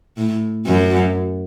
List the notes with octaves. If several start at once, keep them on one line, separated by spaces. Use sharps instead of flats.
A2
F#2